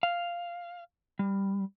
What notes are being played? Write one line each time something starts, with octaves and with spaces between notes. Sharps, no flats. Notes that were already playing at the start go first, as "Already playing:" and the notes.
F5
G3